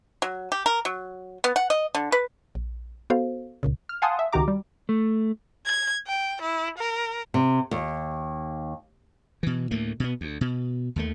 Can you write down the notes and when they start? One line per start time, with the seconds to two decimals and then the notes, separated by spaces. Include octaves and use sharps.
0.22 F#3
0.52 G4
0.66 A#4
0.85 F#3
1.44 B3
1.56 F#5
1.70 D#5
1.95 D3
2.12 B4
2.55 A#1
3.10 B3 F#4 A4 C5 F5
3.63 C#2 A#2 C#3
3.89 F6
4.02 F5 F#5 G#5 A5 C6 D#6
4.19 E5
4.32 C#2 D#3 F#4 G4 A#5 D6
4.48 G3
4.89 A3
5.65 G#6
6.07 G5
6.42 E4
6.78 A#4
7.34 C3
7.71 D#2
9.43 B2 E3
9.71 D2 A2 A3 A#3
10.00 B2 B3
10.21 D2
10.41 B2
10.96 D#2 D#3 A3